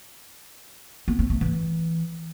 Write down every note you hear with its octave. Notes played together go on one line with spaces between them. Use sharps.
B3
C4
A3
E3